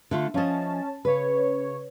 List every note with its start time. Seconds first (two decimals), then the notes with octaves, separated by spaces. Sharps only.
0.11 D3 A3 F4
0.34 F3 C#4 D#5 A5
1.05 C#3 B4 C#5